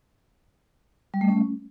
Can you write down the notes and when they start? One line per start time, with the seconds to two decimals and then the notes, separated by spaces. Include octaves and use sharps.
1.14 G3
1.21 A3
1.29 C#4